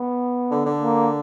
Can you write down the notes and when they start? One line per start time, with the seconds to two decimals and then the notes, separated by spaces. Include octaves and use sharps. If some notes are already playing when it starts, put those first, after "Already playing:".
Already playing: B3
0.51 D3
0.66 D3
0.81 A#3